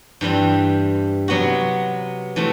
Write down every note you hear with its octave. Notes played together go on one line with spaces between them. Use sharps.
G2 E3 G3 C4
C3 F#3 B3 F#4
C3 E3 A3